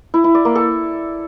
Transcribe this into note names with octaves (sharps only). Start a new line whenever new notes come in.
E4
E4
D5
A#3
A4